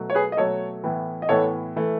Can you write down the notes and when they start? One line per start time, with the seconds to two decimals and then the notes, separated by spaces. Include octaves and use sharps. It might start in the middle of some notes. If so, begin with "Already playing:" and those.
Already playing: B2 F#3 A3
0.10 C#5
0.15 G#4 B4
0.32 D#5
0.37 B2 F#3 A3 A4 C#5
0.84 A2 E3 B3
1.22 D#5
1.29 A2 E3 B3 A4 C#5
1.76 E3 A3